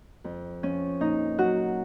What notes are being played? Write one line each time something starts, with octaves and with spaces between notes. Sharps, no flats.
F2
F3 C#4
A#2 D#4
F#3 F#4